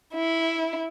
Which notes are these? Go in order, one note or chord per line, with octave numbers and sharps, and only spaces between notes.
E4